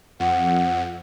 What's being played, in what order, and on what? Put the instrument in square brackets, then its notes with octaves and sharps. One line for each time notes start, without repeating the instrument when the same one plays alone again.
[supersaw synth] F2 [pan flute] F#5